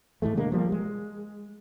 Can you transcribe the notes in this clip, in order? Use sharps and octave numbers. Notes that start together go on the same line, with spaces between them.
G#2 E3 G#3 A3
B2 D3 G#3 A#3
F3 G3 A#3
G#3